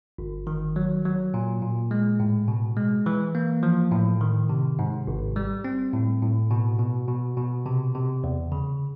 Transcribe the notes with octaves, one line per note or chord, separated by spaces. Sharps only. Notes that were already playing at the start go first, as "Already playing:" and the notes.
G1
D#3
F#3
F#3
A#2
A#2
G#3
A2
B2
G#3
E3
A#3
F3
A2
D#3
C3
G#2
G#1
G3
C4
A2
A2
B2
B2
B2
B2
C3
C3
E2
C#3